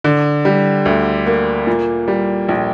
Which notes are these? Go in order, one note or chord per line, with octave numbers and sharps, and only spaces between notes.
D3
G3
D2
A#3
A#2
G3
A#1